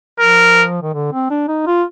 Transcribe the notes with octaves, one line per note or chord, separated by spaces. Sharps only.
F3 A#4
D#3
D3
C4
D4
D#4
F4